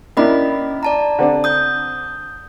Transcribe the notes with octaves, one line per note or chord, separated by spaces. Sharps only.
A#3 C#4 D4 E4 D#5 B5
D5 A5 A#5
D3 C4 D4
D#6 G6